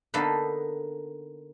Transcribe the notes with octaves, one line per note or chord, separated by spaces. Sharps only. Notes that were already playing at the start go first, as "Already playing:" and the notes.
D3 A#3 B3 D#4 A4 B4